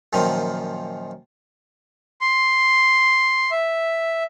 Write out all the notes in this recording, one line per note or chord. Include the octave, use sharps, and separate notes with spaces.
F#2 A#2 D#3 F3
C6
E5